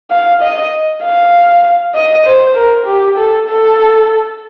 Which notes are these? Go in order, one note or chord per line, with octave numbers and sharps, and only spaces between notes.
F5
D#5
F5
D#5
C5
A#4
G4
A4
A4